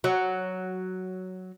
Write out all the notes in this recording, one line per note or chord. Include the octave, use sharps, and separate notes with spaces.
F#3